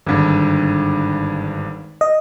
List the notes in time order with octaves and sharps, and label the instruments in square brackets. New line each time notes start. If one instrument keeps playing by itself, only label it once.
[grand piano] G#1 G2 D3
[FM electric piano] D#5